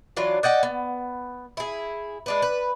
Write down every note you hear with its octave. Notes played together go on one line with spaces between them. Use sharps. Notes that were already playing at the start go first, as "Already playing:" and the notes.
E3 F#3 D4 F4
D5 D#5 F#5 G5
B3
E4 G#4
G#3 D4 B4
B4